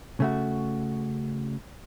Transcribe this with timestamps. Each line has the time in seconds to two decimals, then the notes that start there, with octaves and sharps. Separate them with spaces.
0.20 C#3 A3 F#4